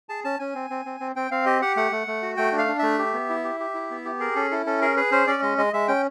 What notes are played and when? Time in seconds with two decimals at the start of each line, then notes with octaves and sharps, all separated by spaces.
0.09 G#4 A5
0.24 C#4 A5
0.39 C#4 G#5
0.55 C4
0.70 C4
0.85 C4
1.00 C4
1.16 C4 G5
1.31 C4 F5
1.46 G4 D#5
1.62 G4 F#5
1.76 A3 F#5
1.92 A3
2.07 A3
2.22 F#4
2.37 A3 G5
2.52 D4
2.59 F5
2.68 D4
2.79 A3 E5
2.99 G4
3.13 B3
3.29 E4
3.44 G4
3.60 G4
3.74 E4
3.91 B3
4.05 G4
4.20 G#4 A#4
4.35 C#4 A4
4.51 E4 A4
4.66 C#4 A4
4.82 G#4 A#4
4.97 G#4 B4
5.12 C#4 C5
5.27 C#4 D5
5.42 G#3 D#5
5.58 G#3 D#5
5.73 G#3 E5
5.88 C#4 G5